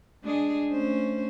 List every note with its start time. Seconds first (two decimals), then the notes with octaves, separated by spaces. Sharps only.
0.23 G#3 D4 G#4
0.71 A3 C#4 C5